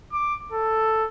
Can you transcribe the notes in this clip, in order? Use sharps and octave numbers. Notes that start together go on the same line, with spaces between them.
D6
A4